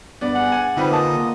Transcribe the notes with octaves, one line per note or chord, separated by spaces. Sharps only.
G2 B3 D5
G#4 F#5
G#5
D3 G3 C4 D#4 F4 B4 F#5
A#3 D#5 F5 A5 C6